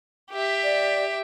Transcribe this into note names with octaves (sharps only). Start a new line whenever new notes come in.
G4 E5
D5